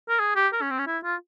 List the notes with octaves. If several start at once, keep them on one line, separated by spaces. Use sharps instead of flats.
A#4
G#4
G4
A#4
C#4
C4
C#4
E4
F4